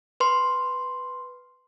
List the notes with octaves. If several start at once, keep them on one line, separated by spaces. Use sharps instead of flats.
B4 C6